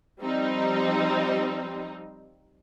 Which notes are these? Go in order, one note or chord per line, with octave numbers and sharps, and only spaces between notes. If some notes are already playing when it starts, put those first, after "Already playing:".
F3 G3 C4 D#4